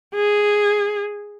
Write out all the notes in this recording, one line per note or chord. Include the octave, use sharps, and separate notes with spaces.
G#4